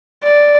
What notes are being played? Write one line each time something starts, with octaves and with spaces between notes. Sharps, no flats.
D5